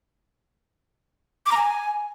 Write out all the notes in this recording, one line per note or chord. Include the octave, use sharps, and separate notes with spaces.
D6
A#5
G#5